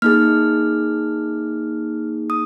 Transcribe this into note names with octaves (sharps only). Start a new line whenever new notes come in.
A#3 D#4 G#4 F6
D#6